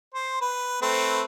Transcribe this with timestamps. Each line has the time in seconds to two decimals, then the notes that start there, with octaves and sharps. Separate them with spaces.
0.14 C5
0.41 B4
0.82 A3 C4 B4